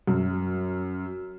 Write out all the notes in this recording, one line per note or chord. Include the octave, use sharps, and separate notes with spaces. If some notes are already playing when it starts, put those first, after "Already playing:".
F#2